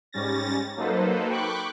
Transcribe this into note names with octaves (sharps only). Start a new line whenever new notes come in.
G#2 G3 C#4 A6 A#6
F#3 A#3 D#4 A4 B4 C5
G5 B5 C#6 D6 F#6